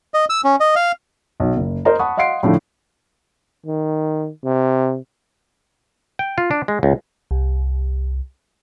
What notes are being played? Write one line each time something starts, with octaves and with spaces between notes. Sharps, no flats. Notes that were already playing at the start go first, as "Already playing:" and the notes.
D#5
E6
C#4
D#5
F5
B1
F#1
A#4 C5 D#5 A#5
F#5 A5 B5 C#6 D#6
D#5 F5 F#5 C6 C7 D7
A2 D3 F3 A3
D#3
C3
G5
F4
D4
G#3
C#2
C2